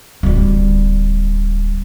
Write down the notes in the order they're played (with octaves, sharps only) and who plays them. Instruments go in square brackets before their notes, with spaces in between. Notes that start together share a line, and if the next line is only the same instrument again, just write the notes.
[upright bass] D1 G3